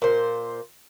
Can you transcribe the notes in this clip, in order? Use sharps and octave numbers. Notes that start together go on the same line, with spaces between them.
A#2 C5